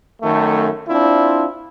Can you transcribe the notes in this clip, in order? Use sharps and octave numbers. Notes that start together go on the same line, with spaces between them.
F#2 D#3 A3
C4 D4 E4 F4